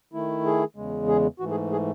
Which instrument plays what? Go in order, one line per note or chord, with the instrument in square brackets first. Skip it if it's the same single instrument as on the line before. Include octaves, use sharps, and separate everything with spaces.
[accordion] D#3 A3 E4
G#4
E2 C#3 G#3
G#4
G#2 E3 A3 F#4
G#4
G#4